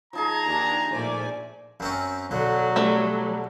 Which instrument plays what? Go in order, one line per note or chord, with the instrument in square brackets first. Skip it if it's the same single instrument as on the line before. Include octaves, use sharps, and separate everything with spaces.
[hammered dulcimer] F3 D#4 G#4 [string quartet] A5 G#6 [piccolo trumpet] A#5
[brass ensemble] D#2 D#3 D4
[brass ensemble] A#1 C5 D5 [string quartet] A#2 A3 G#5
[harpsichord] F#2 C4 C#4
[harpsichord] B1 D3 [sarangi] F#3
[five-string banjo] G3 A3